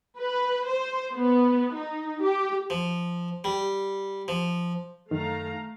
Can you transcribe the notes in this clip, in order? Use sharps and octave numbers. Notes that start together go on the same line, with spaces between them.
B4
C5
B3
D#4
G4
F3
G3
F3
F#2 D#3 A3 F5 A#5